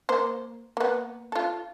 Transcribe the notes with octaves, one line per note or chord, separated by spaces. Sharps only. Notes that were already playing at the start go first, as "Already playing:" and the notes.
A#3 C5
A#3 B3
F4 A4